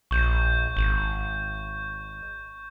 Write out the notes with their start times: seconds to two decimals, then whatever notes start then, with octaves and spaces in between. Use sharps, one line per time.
0.11 A#1 C#6 G6
0.77 G#1